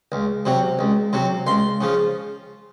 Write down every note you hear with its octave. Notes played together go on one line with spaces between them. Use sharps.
C#2
C3 F#3
C#2
C3 F#3
C#2 C6
C#3 F3